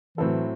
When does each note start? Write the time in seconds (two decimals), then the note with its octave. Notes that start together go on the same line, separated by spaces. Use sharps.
0.17 A2 E3 F#3 C4 E4 A4